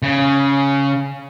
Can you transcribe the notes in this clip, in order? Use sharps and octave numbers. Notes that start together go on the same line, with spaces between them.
C#3